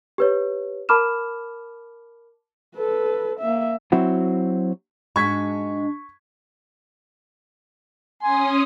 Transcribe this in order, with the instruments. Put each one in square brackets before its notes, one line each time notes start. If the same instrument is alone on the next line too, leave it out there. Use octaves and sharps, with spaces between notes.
[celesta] G4 B4 C#5
A#4 A5 B5 D6 F6 E7
[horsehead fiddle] A4 B4
A#3 E5
[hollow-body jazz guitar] F#3 C4 E4 F#4
[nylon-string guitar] G#2 G#3 F#4 [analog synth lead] D4 [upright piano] C#6 G#6 B6
[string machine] C#4 D#6 [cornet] G#5 [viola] C6